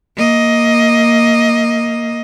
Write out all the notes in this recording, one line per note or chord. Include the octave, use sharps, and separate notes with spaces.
A#3 D#5